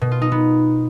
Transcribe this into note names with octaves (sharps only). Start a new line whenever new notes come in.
B2
F4
D#4
B3